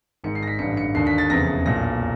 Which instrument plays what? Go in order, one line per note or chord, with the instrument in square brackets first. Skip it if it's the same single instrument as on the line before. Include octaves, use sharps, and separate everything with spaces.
[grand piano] G#1 G#2 D#3 C#7
C7
A#6
B6
A1 G2 D3 C#7
C#7
D#2 D3 C7
B6
A6
F1 E2 C#3 E3 A#6
B1 A#2 A#6